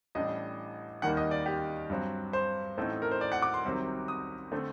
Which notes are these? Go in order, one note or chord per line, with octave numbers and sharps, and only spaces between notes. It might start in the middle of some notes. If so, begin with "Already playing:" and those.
A1 A2 G3 D4 D#5
D#2 D#3 G3 A#3 D#4 F#5
D#5
D5
G4
G2 F#3 C4
C5
A1 A2 A3 C4 D#4
A#4
C5
D5
F#5
D6
C6
C2 C3 D#3 F#3 C4
D#6
D3 A3 C4